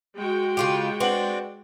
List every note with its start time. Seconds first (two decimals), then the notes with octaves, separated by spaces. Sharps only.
0.16 G#3 F#4 G5
0.57 C#3 F4 G4
1.00 C4 D4 B4 F#5 F#7